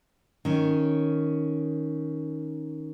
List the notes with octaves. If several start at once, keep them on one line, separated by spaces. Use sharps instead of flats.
D#3 C#4